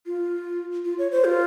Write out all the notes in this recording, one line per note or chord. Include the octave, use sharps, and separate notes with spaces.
F4
F4
C#5
C5
F4